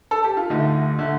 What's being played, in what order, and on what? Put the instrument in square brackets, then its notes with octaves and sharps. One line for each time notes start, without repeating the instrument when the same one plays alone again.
[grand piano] A4
G4
F4
D2 D3 A3 D#4
D3 A3